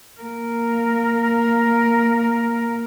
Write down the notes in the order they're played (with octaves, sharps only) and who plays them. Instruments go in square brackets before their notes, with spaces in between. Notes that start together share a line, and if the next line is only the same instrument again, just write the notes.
[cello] A#3 A#4